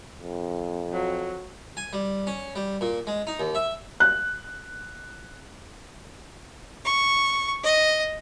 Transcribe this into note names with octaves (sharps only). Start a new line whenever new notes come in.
F2
F#3
G#5
G3
C#4
G3
A#2
G#3
D#4
D#2
E5
F#6
C#6
D#5